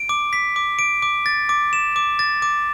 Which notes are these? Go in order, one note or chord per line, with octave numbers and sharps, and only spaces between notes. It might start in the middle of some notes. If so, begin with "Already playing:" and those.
Already playing: D7
D6
B6
D6
D7
D6
A6
D6
E7
D6
A6
D6